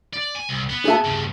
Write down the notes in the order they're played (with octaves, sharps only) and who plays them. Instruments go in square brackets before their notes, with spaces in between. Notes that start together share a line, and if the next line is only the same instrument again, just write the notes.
[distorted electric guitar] D5
G#5
C2
B3
[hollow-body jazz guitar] G#4 E5 A5
[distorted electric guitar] G2 C#3